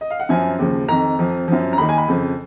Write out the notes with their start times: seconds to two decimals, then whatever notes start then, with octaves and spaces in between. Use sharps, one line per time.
0.01 D#5
0.10 F5
0.20 F#5
0.29 F#2 F3 G#5
0.59 D#2 C#3 F3
0.88 F2 D#3 A#5
1.19 F2 F3
1.48 F#2 F3
1.73 A#5
1.78 D#2 D#3 B5
1.89 G#5
1.98 B5
2.08 F2 C#3 F3